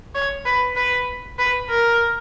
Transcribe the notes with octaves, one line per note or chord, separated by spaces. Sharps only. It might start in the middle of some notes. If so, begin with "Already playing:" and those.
C#5
B4
B4
B4
A#4